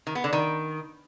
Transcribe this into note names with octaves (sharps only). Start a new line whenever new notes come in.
D#3
B3
D3
D#3